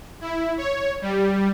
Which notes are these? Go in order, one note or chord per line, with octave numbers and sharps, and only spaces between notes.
E4
C#5
G3